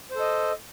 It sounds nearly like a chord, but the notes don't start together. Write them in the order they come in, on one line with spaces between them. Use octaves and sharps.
C5 A4 D#5